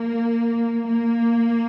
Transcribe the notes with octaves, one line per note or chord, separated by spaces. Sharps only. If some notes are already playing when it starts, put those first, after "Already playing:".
Already playing: A#3
A#3